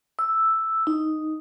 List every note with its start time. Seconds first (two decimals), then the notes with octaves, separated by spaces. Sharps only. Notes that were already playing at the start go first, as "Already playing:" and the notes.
0.19 E6
0.87 D#4